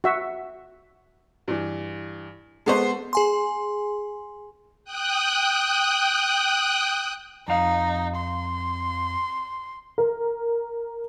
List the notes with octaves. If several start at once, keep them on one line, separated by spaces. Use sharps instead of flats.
F#4 E5
G2 E3
G#3 B3 A4 C5 C#6
G#4 G#5 C6
G5 D#6 F#6
F2 D#4 F5
C6
A#4